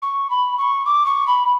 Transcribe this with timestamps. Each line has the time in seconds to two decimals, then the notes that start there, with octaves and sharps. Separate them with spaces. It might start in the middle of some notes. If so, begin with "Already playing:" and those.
0.02 C#6
0.30 B5
0.58 C#6
0.85 D6
1.06 C#6
1.27 B5